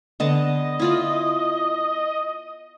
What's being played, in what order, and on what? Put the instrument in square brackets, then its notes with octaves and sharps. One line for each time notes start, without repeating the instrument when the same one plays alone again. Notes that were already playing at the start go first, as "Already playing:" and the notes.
[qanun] D3 B3 A5 [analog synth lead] D#5
[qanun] E4 F4 D5